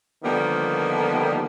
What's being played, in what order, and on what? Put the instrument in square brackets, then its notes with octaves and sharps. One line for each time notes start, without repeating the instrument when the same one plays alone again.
[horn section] D3 D#3 F3 G3 A#3 B3